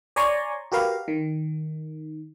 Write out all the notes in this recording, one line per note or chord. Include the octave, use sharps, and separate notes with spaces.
C#5 D5 G#5 A#5 C6 C#6
F#4 G4 A#4 B4 F5
D#3